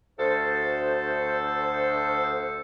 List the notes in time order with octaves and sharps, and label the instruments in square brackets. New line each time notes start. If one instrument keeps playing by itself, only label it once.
[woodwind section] D2 A4 C5